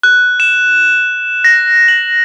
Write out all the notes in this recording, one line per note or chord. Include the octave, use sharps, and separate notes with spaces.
F#6
E7
A#6
F#7